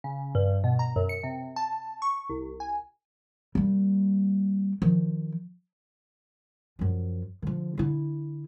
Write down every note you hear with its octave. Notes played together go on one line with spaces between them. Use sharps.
C#3
G2
B2
A#5
F#2
C#7
C3
A5
C#6
C2
G#5
G3 A#3
D#3 F3
F#2 F3
D3 F3
D3 E4